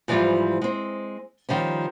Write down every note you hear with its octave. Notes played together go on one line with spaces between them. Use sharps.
G#2 E3 F3 G3 F4
G#3 C4
D#3 F3 G3 C#4